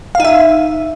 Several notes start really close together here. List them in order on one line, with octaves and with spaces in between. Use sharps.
F5 D#4 E5